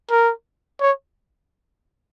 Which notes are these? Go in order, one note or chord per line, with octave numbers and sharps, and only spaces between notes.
A#4
C#5